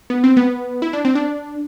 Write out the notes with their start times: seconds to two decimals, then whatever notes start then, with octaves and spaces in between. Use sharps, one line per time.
0.10 B3
0.24 C4
0.37 B3
0.82 E4
0.93 D4
1.05 C4
1.15 D4